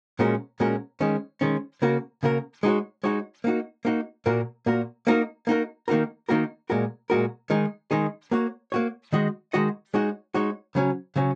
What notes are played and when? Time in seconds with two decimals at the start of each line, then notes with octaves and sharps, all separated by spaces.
0.19 A#2 G#3 C#4 F#4 A#4
0.60 A#2 G#3 C#4 F#4 A#4
1.01 D#3 G#3 C#4
1.41 D#3 G#3 C#4
1.82 C#3 A#3 F#4 A#4
2.23 C#3 A#3 F#4 A#4
2.63 G#3 D#4 F#4 C#5
3.04 G#3 D#4 F#4 C#5
3.44 A#3 D#4 F#4
3.85 A#3 D#4 F#4
4.26 A#2 A#3 F#4 A#4
4.66 A#2 A#3 F#4 A#4
5.07 A#3 D#4 F#4 A#4
5.47 A#3 D#4 F#4 A#4
5.88 D#3 A#3 D#4 F#4 A#4
6.29 D#3 A#3 D#4 F#4 A#4
6.70 A#2 G#3 F#4 A#4
7.10 A#2 G#3 F#4 A#4
7.50 D#3 G#3 D#4 G#4
7.91 D#3 G#3 D#4 G#4
8.31 A#3 F#4 C#5
8.72 A#3 F#4 C#5
9.12 D#3 G#3 F#4 D#5
9.53 D#3 G#3 F#4 D#5
9.94 G#3 D#4 F#4 C#5
10.34 G#3 D#4 F#4 C#5
10.75 C#3 F#3 C#4
11.16 C#3 F#3 C#4